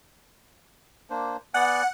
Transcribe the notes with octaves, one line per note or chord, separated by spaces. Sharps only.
A#3 D4 C5
B3 D5 F#5 G#5